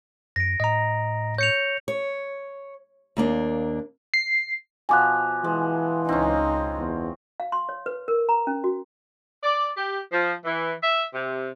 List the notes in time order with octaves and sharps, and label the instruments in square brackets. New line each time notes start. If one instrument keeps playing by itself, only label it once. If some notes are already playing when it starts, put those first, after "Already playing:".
[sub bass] F#2 [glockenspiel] A#6 D7
[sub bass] A2 [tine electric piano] D#5 A#5
[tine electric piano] C#5 [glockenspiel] G6 C#7 F7
[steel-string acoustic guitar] C#5
D#2 A#3 D4
[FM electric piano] C7
[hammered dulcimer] B2 F3 [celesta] G#5 D6 F#6
[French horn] E3 [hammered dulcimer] G#3
[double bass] C#2 D#4 [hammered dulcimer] C4 C#4
[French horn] E2
[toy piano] F5
C6
C#5
B4
A#4
A#5
C#4
F#4
[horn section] D5
G4
F3
E3
E5
C3